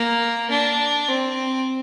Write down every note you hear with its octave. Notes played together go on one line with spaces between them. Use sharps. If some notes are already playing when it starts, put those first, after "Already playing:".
Already playing: A#3
D4
C4